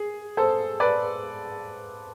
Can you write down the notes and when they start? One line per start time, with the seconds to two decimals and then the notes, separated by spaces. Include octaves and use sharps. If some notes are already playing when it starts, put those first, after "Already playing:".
Already playing: G#4
0.37 A4 C5
0.80 B4 D5